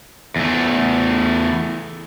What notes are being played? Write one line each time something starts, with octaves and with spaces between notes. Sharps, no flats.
E2 A3